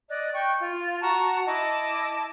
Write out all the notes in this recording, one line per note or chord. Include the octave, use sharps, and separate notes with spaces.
D5 D#5 F#6
G5 C#6 G6
F4
F#4 A5 A#5 C#6
E4 D#5 A5 D6